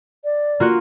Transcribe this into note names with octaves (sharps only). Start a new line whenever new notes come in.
D5
A#3 F4 F#4